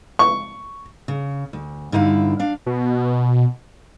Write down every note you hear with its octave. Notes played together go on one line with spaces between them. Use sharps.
C#6
C#3
D2
G2 D3 D#4 E4 F5
D4 F5
B2